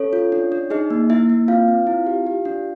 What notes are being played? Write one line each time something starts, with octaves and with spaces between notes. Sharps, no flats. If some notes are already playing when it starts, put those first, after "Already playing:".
Already playing: C#4 A4 C#5
F4
D4
D4
D#4 G#4 D#5
A#3
A#3 E4 E5
A#3
C4 F4 F5
C4
E4
G4
G4
D4